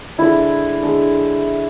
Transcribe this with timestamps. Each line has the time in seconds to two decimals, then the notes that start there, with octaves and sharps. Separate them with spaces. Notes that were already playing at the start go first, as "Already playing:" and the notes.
0.18 D3 G#3 D4 E4
0.83 D3 G#3 D4